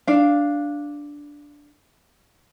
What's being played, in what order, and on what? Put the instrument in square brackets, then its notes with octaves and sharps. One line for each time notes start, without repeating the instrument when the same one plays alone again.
[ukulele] D4 F5